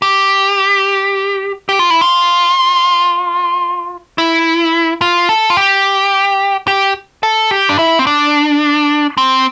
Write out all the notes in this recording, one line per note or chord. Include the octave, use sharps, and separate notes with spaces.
G4
G4
F4
E4
F4
E4
F4
A4
F4
G4
G4
A4
G4
D4
E4
C4
D4
C4